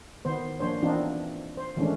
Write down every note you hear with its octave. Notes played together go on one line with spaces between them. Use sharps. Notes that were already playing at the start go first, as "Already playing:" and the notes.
D#3 B3 C5
F3 A#3 D4 C5 C#5
E3 B3 C4 D4 D#4 F4
C5
D#3 E3 G#3 A3 C#4 D4